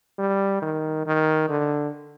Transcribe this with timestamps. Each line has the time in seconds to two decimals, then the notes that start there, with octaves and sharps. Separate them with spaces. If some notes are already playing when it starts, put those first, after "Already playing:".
0.19 G3
0.62 D#3
1.06 D#3
1.49 D3